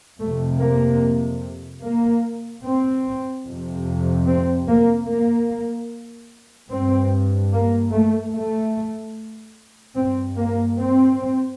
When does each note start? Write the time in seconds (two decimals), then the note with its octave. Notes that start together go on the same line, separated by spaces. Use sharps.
0.20 F2 C3 A3
0.60 A#3
1.82 A#3
2.64 C4
3.45 F2 C3
4.27 C4
4.68 A#3
5.08 A#3
6.70 G2 C4
7.53 A#3
7.92 A3
8.34 A3
9.96 G2 C4
10.37 A#3
10.78 C4